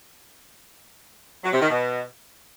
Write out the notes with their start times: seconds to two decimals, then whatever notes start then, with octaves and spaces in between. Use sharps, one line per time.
1.44 F#3
1.52 C3
1.61 D#3
1.69 B2